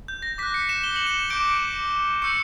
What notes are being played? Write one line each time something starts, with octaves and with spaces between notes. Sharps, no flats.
G6
A#6
D6 F#6 B6
C#7
E7
G7
F#7
E7
D6 G6 D7
C#6 E6 G6 C#7